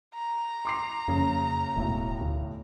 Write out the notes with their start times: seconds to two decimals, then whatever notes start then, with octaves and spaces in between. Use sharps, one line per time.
0.14 A#5
0.65 C6 D6 C7
1.08 F#1 F2 C#3
1.76 D#1 B1 A2
2.21 D2